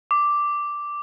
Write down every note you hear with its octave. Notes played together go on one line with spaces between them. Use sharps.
D6